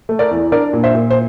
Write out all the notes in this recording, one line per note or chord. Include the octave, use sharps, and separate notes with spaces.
A3
A#4 D5
E2
D4 A#4 D5
A#2
C5 E5
A#2
C5